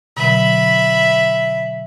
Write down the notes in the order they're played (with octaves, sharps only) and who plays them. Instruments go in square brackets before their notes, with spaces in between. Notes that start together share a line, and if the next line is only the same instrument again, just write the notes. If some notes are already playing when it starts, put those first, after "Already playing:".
[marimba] B2 D3 F#3 [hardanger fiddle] E5 B5